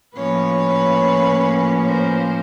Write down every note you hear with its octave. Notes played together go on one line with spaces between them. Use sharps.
A2 F3 A#3 C#4 B4 C#5
A#4 C5